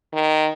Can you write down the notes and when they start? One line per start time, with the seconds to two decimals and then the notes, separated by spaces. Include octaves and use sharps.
0.13 D#3